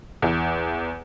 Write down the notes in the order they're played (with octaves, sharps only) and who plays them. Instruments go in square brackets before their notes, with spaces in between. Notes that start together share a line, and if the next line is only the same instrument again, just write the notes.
[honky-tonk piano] E2 E3